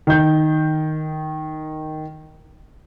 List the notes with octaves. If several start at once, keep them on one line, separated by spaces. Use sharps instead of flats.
D#3 G6